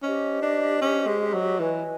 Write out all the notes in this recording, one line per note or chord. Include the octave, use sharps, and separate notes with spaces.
C#4 G4 C5 D#5
D4
C#4
G#3
F#3
E3 B4 D#5 G#5